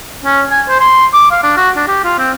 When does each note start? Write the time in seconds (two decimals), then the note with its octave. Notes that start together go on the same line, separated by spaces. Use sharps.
0.25 C#4
0.51 G#5
0.69 C5
0.80 C6
1.14 D6
1.32 F5
1.43 D4
1.57 F#4
1.76 D4
1.88 G4
2.04 F4
2.18 C4